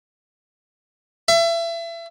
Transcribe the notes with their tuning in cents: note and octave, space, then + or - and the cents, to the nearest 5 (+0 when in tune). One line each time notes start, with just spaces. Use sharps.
E5 +30